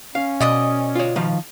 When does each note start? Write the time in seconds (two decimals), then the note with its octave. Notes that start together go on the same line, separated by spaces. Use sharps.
0.15 C#4 F5
0.40 B2 D5 D#5 D#6
0.95 F4 C#5
1.16 D#3 F3 F5